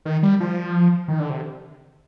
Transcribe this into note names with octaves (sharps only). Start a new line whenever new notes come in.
D#3
G3
F3
D#3
D3
C3